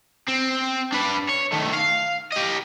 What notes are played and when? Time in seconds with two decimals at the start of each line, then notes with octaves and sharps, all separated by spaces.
0.28 C4
0.93 D4 B4
1.29 C#5
1.53 D#3 A3
1.74 F5
2.33 G4 D#5